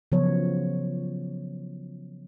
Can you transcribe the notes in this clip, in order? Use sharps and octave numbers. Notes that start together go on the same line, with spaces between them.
C#3 F3 F#3 B3 F4 C#5